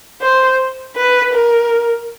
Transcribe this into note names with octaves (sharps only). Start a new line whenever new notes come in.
C5
B4
A#4